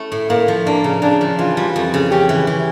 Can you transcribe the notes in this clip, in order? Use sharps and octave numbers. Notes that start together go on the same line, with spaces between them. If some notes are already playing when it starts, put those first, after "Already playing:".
Already playing: A3 C#4 E4
A2
A2 A#3
F3
A#3 D4
C#3
C#3 D4
F3
E3 F4
G3
F2
C#3
C#4 G4
E3
E3